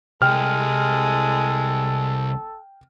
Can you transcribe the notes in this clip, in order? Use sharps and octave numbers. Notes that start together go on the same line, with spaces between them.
C2 G#3 A4 G5 F6